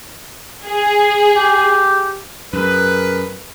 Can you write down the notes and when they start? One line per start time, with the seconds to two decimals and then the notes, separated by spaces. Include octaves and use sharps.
0.65 G#4
1.36 G4
2.53 F#2 G#4 A#4 B4